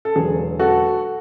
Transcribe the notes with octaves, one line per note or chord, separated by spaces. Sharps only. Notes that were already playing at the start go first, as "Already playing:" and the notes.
A4
E1 E2 D3 F#3 G#4
F#4 A4